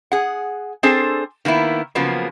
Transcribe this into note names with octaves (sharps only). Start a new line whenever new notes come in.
G#4 F#5
C4 D4 G#4 A4 C5
D#3 A#3 B3 E4
C#3 F3 F#3 A#3 B3